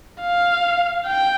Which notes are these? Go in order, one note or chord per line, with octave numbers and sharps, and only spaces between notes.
F5
G5